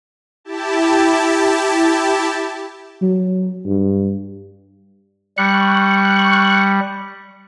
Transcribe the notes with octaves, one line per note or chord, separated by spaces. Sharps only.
E4 G4 A5
F#3
G2
G3 C#6 F#6